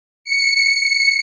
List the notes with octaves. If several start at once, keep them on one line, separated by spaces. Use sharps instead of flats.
C#7